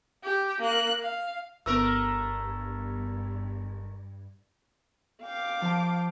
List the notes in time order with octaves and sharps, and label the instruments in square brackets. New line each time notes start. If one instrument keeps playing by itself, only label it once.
[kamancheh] G4
A#3 F#6
F5
[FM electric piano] G1 B3 [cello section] G2 [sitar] A3 A#4 [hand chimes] E6
[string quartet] F5 G5 D6
[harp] F3 A5